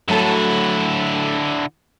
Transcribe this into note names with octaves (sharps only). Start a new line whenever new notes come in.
D3 F#3 A3 E4 A4